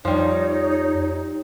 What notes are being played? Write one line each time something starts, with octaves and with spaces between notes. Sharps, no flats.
F2 F3 G3 D#4 C#5